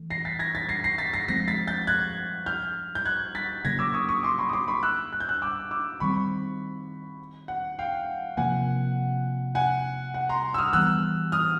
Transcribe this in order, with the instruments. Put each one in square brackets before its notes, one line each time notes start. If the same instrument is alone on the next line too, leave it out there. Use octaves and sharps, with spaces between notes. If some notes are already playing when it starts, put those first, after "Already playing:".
Already playing: [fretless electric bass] E3 A3
[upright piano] A#6 C7
A6 B6
G#6 A#6
A6 B6
A#6 C7
A#6 C7
A6 B6
A#6 C7
[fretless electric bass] F3 G#3 C4 [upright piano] A#6 C7
[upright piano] A6 B6
G6 A6
F#6 G#6
F6 G6
G6
F#6 G#6
A6 B6
[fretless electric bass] C#3 F#3 A#3 [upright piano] G#6 A#6
[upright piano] D6 E6
C#6 D#6
C#6 D#6
C6 D6
B5 C#6
D#6
C6 D6
B5 C#6
E6 F#6
F#6
G6
E6 F#6
D6 E6
D6 E6
[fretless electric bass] D#3 G3 C4 [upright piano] B5 C#6
[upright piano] F#5
F5 G5
[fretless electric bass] C3 F3 A#3 [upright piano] F#5 G#5
[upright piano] F#5 G#5
F#5
A#5 C6
E6
D#6 F6
[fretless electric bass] E3 G3 B3 [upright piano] E6 F#6
[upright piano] D#6 F6